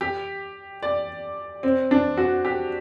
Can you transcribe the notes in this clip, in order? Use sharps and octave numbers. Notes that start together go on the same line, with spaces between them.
G4
D5
C4
D4
F#4
G4